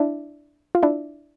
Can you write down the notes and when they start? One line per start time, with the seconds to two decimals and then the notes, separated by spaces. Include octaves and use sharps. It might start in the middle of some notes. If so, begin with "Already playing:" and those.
Already playing: D4 E4
0.75 F4
0.83 D4 E4